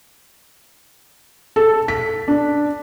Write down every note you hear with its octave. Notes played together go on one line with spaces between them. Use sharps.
A4
B6
D4